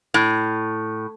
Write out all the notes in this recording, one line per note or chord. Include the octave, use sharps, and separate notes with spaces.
A2